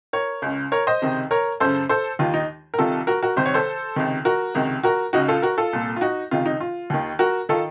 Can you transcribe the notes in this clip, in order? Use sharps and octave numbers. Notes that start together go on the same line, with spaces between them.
A#4 C#5
C#2 C#3
A#4 C#5
C5 D#5
C#2 C3 D#3
A#4 C#5
F#2 C#3 A4 C5
A4 C5
D#2 D#3 F4
D#4
A#4
C2 C3 D#3 F4 A4
F#4 A#4
F#4 A#4
C2 C3 D#3 C5
C#5
A4 C5
C#2 C3 D#3
F#4 A#4
C#2 C3 D#3
F#4 A#4
C#2 C#3 D#4 F#4
F4 A4
F#4 A#4
F4 A4
C2 A#2
F4
D#4 F#4
C#2 C3 D#3 F4
D#4
F4
D#2 D#3
F#4 A#4
D#3 F4 A4